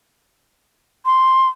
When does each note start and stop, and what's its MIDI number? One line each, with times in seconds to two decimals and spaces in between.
1.06 1.49 84